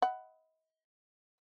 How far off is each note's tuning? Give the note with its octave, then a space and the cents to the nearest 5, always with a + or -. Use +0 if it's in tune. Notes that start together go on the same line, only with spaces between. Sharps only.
D#5 +40 F#5 +10 B5 +10